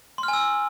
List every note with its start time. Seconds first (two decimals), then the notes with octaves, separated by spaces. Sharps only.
0.18 C6
0.23 F6
0.28 G#5
0.33 E6